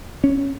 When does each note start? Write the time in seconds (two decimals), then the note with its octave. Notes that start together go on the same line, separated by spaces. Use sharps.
0.24 C#4